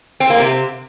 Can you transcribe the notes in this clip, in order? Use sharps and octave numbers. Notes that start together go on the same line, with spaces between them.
C4
A#3
C3